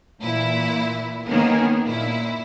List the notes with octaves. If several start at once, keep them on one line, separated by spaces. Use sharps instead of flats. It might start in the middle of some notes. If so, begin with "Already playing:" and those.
A#2 E3 E4
D#3 A#3 B3 C#4 G#4 A#4
A#2 E4